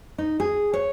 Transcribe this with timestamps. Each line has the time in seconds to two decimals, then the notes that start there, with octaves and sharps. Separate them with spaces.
0.18 D#4
0.40 G#4
0.73 C#5